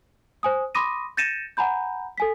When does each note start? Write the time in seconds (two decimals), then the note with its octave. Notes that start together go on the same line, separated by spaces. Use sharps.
0.43 C5 G#5 D#6
0.75 B5 C6 D6 D#6 A#6 D#7
1.17 G6 A6 A#6 C#7 D#7 E7
1.57 F#5 G#5 A#5 B5 G6
2.18 A4 G#5 B6